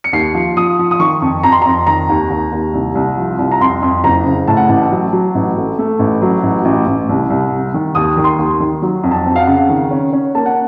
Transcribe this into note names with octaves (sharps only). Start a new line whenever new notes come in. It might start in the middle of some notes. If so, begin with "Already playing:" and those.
C#7
D#2 C7
F3
F3 D#6
F3
D#6
D#3 C#6
F2
F2 A#5
C6
F2 A#5
D#3 A#5
D#2
D#2
D#2
C2
C2
F3
C2
A#5
F2 C6
F2
F#1 A#5
C#3
A2 A5
F#5
A1 A5
F#3
F#3
A1
A3
A3
A1
F#3
A1
A1
A1
C2
C2
C3
D#3
D#2 D#6
D#3
C6
D#2
D#3
F#3
F2
A5
C4
F5
F#5
C#3
D#3
C#4
C#4
A#3 A5
F#5